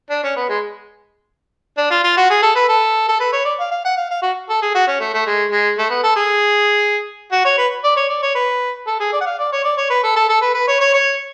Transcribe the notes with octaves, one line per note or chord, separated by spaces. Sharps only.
D4
C#4
B3
G#3
D4
F4
F4
F#4
G#4
A4
B4
A4
A4
B4
C#5
D5
F5
F5
F#5
F5
F5
F#4
A4
G#4
F#4
C#4
A3
A3
G#3
G#3
A3
B3
A4
G#4
F#4
C#5
B4
D5
C#5
D5
C#5
B4
A4
G#4
D5
F#5
F5
D5
C#5
D5
C#5
B4
A4
A4
A4
B4
B4
C#5
C#5
C#5